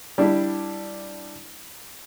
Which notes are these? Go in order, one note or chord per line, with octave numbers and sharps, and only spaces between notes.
G3 D4 E4